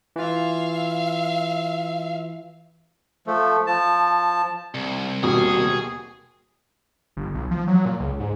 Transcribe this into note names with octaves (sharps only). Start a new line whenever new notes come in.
E3 F4 E5 F5
F3 A3
F3 A5
C2
D#2 B2 G#4
G1
B1
F3
F#3
A#2
C#2
G#2